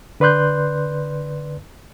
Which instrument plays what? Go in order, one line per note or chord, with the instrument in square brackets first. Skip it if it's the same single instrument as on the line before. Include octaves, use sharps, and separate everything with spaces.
[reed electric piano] D3 B4 D5 C6 F#6 G6